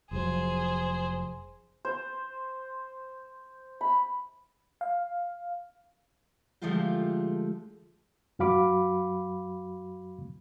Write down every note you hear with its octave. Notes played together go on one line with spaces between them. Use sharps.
F1 F3 F#3 G#4 C5
C5
B5
F5
D3 F3 G#3 A3 F4 G4
F#2 F#3 F#4 F5 B5 D6